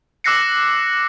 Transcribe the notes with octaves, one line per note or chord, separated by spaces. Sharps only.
D6 E6 F#6 A#6 C7 C#7